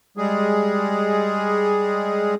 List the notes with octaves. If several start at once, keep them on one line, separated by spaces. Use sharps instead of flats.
G3 G#3 G#4